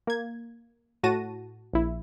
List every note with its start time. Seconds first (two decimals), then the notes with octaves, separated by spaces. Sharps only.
0.07 A#3 G#6
1.03 A2 F#4 A5 A#6 D#7
1.73 A#1 E4